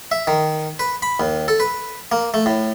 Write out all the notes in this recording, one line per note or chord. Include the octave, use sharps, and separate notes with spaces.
E5
D#3
B4
B5
D#2
A4
B4
A#3
A3
A2